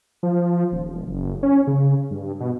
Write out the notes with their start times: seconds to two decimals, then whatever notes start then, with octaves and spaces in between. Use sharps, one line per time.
0.23 F3
0.72 D#1
0.90 E1
1.08 F#1
1.43 C#4
1.67 C#3
2.11 G2
2.40 B2